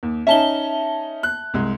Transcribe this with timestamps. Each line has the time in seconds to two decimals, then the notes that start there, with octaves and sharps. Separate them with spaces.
0.03 D#2
0.27 C#4 D#4 E5 A5 G7
1.23 F#6
1.54 C2 G#3